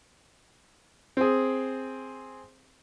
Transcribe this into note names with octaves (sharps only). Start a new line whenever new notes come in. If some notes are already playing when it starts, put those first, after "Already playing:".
C4 G#4